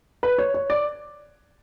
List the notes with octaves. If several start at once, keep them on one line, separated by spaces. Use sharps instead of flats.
B4
C#5
C#5
D5